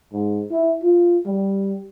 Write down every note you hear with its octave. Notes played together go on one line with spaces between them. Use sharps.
G#2
E4
F4
G3